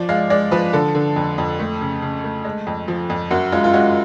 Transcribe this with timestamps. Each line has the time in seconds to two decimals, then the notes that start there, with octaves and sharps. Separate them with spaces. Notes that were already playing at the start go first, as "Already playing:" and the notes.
Already playing: F3 D5
0.09 G#3 F5
0.30 G#3 D5
0.51 F3 B4
0.73 D3 A4
0.95 D3
1.16 F2
1.38 F2
1.59 A3
1.81 C#3
2.02 C#3
2.24 A3
2.45 G#3
2.67 F2
2.88 F3
3.10 F2
3.31 F#2 F#4
3.52 G#3 F4
3.64 F4
3.73 G#3 F#4